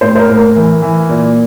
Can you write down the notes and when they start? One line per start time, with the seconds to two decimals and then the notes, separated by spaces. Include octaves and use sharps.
0.01 A2 C5
0.15 C5
0.19 A#4
0.29 A2
0.37 A#4
0.56 E3
0.82 E3
1.09 A#2